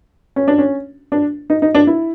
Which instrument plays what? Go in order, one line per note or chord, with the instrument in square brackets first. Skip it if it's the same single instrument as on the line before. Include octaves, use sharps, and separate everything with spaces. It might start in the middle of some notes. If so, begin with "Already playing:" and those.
[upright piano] C#4
D4
C#4
D4
D#4
D#4
D4
E4